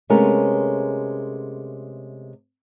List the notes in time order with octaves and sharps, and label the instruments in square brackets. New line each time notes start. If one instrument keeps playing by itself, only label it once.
[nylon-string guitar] C3 G#3 A3 B3 C#4 A#4